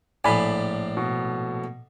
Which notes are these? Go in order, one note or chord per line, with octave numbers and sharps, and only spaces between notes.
A#1 A2 D5 G#5 B5
B2